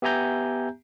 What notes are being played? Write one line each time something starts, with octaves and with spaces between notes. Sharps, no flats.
B3 G4 E5 G#5 A#5 G6